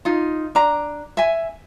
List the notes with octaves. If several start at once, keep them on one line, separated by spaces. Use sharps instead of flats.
D#4 F4
D4 A#5
E5 G#5